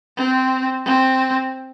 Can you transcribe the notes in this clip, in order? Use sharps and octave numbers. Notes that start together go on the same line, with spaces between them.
C4
C4